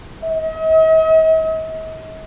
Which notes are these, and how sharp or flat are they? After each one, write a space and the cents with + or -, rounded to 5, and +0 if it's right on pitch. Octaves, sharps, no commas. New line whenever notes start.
D#5 +45